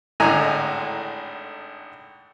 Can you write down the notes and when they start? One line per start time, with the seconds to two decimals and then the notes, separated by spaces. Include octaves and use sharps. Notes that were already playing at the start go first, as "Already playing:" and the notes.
0.20 G#1 A2 D3 D#4 G#5 A#5